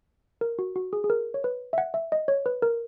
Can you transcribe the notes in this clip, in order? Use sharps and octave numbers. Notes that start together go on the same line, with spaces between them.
A#4
F#4
F#4
G#4
G#4
A#4
C#5
B4
E5
F#5
E5
D#5
C#5
B4
A#4